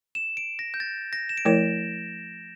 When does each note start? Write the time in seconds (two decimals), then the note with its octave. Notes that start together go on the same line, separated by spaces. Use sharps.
0.15 E7
0.37 D7
0.59 A#6
0.74 G6
0.80 A6
1.13 A#6
1.29 E7
1.38 D7
1.45 F3 A3 E4 A#4 C#5 E7